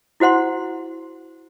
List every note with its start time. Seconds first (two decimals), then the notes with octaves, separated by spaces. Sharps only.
0.20 E4 F#4 C5 F#5 C6